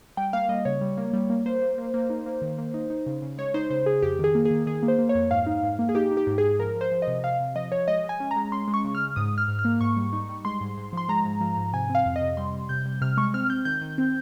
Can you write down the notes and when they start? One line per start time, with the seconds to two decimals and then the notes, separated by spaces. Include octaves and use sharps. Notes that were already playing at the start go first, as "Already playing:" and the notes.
0.17 G3 G5
0.33 A#3 F5
0.49 G3 D#5
0.65 C#3 C#5
0.81 G3
0.97 A#3
1.13 G3
1.30 A#3
1.46 A#3 C5
1.62 A#3
1.78 A#3
1.94 A#3
2.10 D#4
2.26 A#3
2.42 D#3
2.58 A#3
2.74 D#4
2.90 D#4
3.06 C#3
3.22 C#3
3.38 G#3 C#5
3.54 D#4 C5
3.70 C#3 C5
3.86 C#3 G#4
4.02 F2 G4
4.19 D#3 G#4
4.35 A#3
4.45 G#4
4.51 D#3
4.66 D#3 G#4
4.83 A#3
4.88 C5
4.99 A#3
5.09 C#5
5.15 F2
5.30 G#2 F5
5.47 D#4
5.63 G#2
5.79 A#3
5.89 G#4
5.95 D#4 G4
6.11 D#4
6.17 G4
6.27 G#2
6.38 G#4
6.44 G#2
6.59 F3 A#4
6.75 F3
6.81 C5
6.92 F3
7.02 D#5
7.07 C3
7.24 C3 F5
7.40 C3
7.55 F3 D#5
7.72 F3 C#5
7.88 G#3 D#5
8.04 G#3
8.09 G#5
8.20 C#4
8.31 A#5
8.36 G#3
8.52 C#4 C6
8.68 G#3
8.74 C#6
8.84 C#3
8.95 F6
9.00 G#3
9.16 G#2 D#6
9.32 G#2
9.38 F6
9.48 G#2
9.59 F6
9.65 A#3
9.81 G#2 C#6
9.97 G3
10.13 D#4
10.29 G3
10.45 G#3 C6
10.61 G#2
10.77 G#2
10.93 F3 C6
11.09 G#3 A#5
11.25 G#2
11.41 F3
11.57 G#2
11.73 C3 G#5
11.89 C4
11.95 F5
12.05 F2
12.16 D#5
12.21 C3
12.37 G3 C6
12.53 G3
12.69 C3 G6
12.86 G3
13.01 C3 F6
13.17 G#3 C#6
13.34 C4 F6
13.50 C4 G6
13.65 D#3 G6
13.82 D#3
13.98 C4